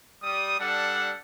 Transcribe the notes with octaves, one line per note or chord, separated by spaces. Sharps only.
G3 D#6
G3 D4 A4 F#5